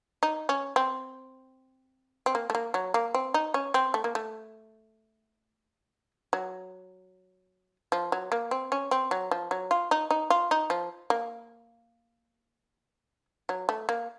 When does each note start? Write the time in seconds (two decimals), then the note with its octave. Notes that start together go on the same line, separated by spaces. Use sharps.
0.23 D#4
0.49 C#4
0.76 C4
2.26 C4
2.35 A#3
2.50 A3
2.55 A#3
2.74 F#3
2.94 A#3
3.14 C4
3.34 D#4
3.54 C#4
3.74 C4
3.94 A3
4.04 A#3
4.15 A3
6.33 F#3
7.92 F3
8.12 F#3
8.32 A#3
8.51 C4
8.72 C#4
8.91 C4
9.11 F#3
9.31 F3
9.51 F#3
9.71 F4
9.91 D#4
10.11 D#4
10.30 F4
10.51 D#4
10.70 F3
11.10 A#3
13.49 F#3
13.69 A3
13.89 A#3